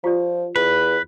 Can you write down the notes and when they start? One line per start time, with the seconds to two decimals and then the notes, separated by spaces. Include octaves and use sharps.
0.04 F3 F4 G4 D5
0.56 E2 B4